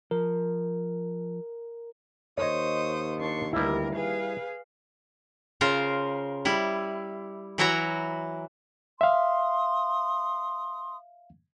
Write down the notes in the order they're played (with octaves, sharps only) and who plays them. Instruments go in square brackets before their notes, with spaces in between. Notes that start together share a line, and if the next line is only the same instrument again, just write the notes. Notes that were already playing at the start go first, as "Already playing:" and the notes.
[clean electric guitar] F3 [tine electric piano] A#4
[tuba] D#2 [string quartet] C5 C#6 D#6 [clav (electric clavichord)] C#5 D#5
[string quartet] D4 C6 C#6
[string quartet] D2 G2 A#4 [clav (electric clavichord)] G3 E4
[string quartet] G#4 B4 F5
[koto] C#3 F4 A#4 C5
G3 E4
E3 F#3 E4 F#4 E5 A#5
[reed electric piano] E5 F5 [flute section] C6 D#6